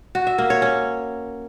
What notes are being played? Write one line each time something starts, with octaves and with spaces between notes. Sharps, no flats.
F#4
E5
A#3
C#5
C#4